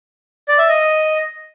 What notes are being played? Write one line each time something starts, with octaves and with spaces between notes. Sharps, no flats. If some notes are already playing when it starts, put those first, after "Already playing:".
D5
E5
D#5